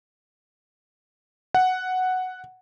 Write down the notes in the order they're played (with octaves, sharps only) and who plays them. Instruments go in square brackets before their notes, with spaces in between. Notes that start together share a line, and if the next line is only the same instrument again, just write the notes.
[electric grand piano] F#5